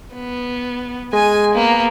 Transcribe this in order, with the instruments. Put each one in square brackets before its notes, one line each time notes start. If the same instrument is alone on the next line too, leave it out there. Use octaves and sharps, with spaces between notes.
[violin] B3
[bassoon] G#3 [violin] G#5 D#7
[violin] A#3 B3